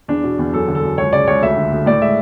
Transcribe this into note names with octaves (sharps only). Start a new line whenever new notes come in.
E2 D4
B2
E2
F#2 A4
D3
A4
F#2
C#2 C#5
C#3 D5
C#2 C#5
D2 E5
D3
D2
A2 D5
G#3 E5